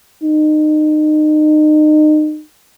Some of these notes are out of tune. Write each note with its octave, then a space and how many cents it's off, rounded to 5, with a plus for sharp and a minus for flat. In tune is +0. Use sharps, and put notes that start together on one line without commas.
D#4 -30